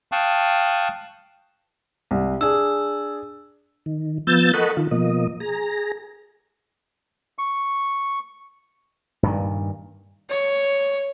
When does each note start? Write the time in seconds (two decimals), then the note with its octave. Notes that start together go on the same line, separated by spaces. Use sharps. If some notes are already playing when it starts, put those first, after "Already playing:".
0.12 F5 G5 A5 C#6 D#6 F#6
2.11 C2
2.41 D4 G#4 E6
3.86 D#3
4.27 F3 B3 E6 G6 A6
4.54 A4 A#4 D#5 F#5 B5 C#6
4.77 D#3 F4
4.91 B2 F3 A#3 D#5
5.40 G#4 A#5
7.39 C#6
9.23 G2 A#2 D#3
10.30 C#5